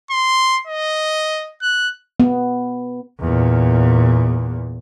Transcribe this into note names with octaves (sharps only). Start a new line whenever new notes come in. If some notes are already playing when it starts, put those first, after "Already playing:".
C6
D#5
F#6
B3
E2 A#2